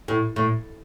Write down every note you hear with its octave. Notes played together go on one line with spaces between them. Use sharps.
A2
A2